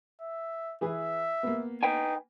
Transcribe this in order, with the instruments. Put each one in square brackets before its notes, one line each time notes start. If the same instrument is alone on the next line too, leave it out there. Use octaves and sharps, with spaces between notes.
[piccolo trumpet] E5
[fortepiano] E3 G#4 B4 [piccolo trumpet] E5
[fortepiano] A#3 B3
[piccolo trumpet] D#4 [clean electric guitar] B4 G5 G#5